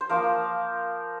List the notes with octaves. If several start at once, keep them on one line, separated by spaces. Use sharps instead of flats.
C5
F3 A#3 F4 A#4